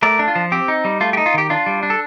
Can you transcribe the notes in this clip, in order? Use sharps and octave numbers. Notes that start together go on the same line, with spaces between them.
A3 A#4 D5
D4
F4
F3
C4 G4
D#4
G3
A3 F4
G4
D#4
F4
D#3 G4
D4 F4
G3
D4
A4